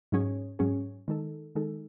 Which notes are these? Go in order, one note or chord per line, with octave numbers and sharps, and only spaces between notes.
G#2 F#3 C#4 G#4 C#5
G#2 F#3 C#4 G#4 C#5
D#3 G#3 D#4 A4
D#3 G#3 D#4 A4